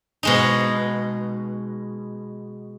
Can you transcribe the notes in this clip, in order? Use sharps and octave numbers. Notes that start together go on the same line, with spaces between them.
B2 G#3 D#4